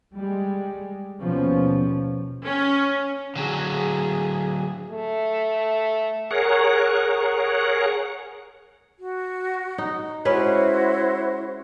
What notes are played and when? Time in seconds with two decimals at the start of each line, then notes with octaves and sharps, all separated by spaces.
0.16 G3 G#3
1.22 D#2 B2 F3 C#4
2.43 C#4
3.36 D3 F#3 G#4
4.91 A3
6.31 G#4 A#4 C#5 F#5
8.99 F#4
9.78 D#4
10.25 G#3 C#4 E4 F#4 B4 C5